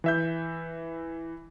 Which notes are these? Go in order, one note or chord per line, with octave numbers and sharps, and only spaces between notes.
E3 E5 G6